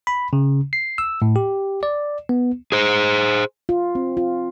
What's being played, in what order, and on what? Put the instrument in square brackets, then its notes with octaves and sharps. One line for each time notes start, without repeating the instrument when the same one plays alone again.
[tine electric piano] B5
C#3
C7
E6
A2
G4
D5
B3
[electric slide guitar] G#4 C5
[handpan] F4
C4
F4